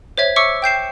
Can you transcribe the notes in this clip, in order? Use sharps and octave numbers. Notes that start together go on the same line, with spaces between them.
C5 C#5 E5 G#6
E5 C#6 D6 E6 C#7
G5 G6 C7 E7